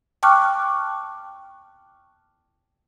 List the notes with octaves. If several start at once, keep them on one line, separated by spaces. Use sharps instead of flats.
G5 A5 C#6 D6 F6 F#6